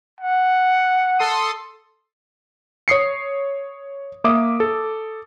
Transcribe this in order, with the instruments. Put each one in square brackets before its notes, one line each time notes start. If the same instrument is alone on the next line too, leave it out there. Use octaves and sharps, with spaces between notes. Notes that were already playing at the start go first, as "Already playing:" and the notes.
[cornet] F#5
[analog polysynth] A4 C6 D#6
[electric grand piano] C#5 D#6 C7 C#7
A#3 E5 D6 D#6
A4